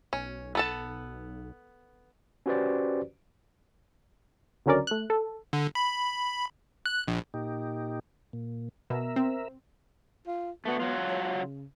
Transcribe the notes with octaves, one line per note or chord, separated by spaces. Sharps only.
B1 C#4
B3 A4 A5
C#4 F#4 G4 B4 C5 D5
C#2 D3 F#3 C#4 A#4 D5
A3 F#6
A4
D3
B5
F#6
A#1
A#2 D#4 G4
A#2
B2 A#4 E5
C4
F4
A3 B3 F#4
F#3 F4
C#5
C#3